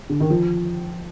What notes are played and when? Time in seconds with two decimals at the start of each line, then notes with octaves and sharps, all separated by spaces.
0.10 D3
0.20 D#3
0.30 F3